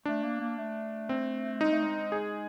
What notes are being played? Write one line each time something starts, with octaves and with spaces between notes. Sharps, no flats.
A3 D4
A#3
A#3
A3
C4
G#3 D#4
A3
G#3
G#4